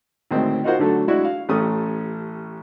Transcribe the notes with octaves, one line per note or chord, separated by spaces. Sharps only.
D2 A2 D#3 G#3 C4
D#4 F4 F#4 A#4 C5 F#5
D3 F#3 A3 A4
G#3 D4 E4 F#4 D5
F5
A1 A3 C#4 G4 A4 D#6